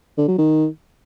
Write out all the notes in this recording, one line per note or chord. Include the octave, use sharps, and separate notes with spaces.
D3
F#3
D#3